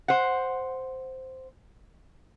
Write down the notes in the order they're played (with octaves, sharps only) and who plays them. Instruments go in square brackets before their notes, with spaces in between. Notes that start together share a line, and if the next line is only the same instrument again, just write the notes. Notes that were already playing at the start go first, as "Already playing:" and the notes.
[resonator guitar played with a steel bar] C5 F#5